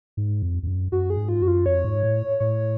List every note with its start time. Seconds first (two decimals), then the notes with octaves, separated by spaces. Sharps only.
0.17 G#2
0.42 F2
0.63 F2
0.67 F#2
0.92 F#2 F#4
1.10 G#4
1.16 G#2
1.29 F4
1.41 F#2 F#4
1.48 F4
1.66 F2 C#5
1.85 G#2
2.03 A2
2.40 A2 C#5